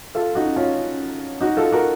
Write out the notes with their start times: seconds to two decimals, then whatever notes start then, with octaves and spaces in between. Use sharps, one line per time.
0.15 F4 A4
0.35 D#4 F#4
0.56 C#4 F4
1.41 D#4 F#4
1.57 F4 A4
1.72 F#4 A#4